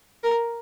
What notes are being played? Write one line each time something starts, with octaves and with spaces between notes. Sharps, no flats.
A#4